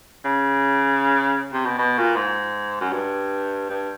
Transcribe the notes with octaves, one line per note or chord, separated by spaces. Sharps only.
C#3
C3
B2
B2
A#2
G#2
F#2
G2
G2